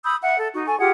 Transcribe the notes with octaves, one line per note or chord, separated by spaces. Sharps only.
B5 D#6 E6 G6
E5 F#5
A4
D#4 F#4
A4 G#5 C#6
F4 G4 G#4 F#5